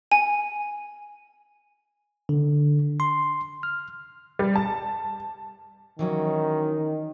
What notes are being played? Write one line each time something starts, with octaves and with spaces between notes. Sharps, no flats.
G#5
D3
C6
F6
G3
A5
D#3 E3 F#3 C#4